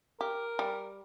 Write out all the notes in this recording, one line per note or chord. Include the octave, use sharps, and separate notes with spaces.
G4 A#4
G3